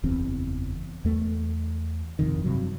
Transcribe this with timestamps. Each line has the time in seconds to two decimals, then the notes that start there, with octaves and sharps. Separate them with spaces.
0.04 F#1 E2 C4
1.05 E2 A3
2.19 G1 F2 C3 D#3
2.44 G2 C3 F#3